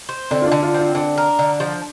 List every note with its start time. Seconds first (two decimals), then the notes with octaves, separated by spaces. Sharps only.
0.09 C5
0.31 D3 C4
0.42 F4
0.47 D3 D4
0.62 F4
0.74 C4 F4
0.95 D3 D4
1.17 A#4
1.39 D3
1.60 F3